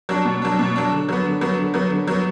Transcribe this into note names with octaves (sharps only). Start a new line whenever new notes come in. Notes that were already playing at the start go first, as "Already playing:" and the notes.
F#3 D4
B2
F#3 D4
B2
F#3 D4
D3
F#3 B3
D3
F#3 B3
D3
F#3 B3
D3
F#3 B3